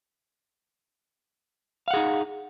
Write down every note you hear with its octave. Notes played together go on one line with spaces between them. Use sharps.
D#4 G#4 F5 F#5